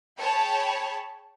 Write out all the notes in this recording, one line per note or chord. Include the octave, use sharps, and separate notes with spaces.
G#4 C#5 G5 A5 B5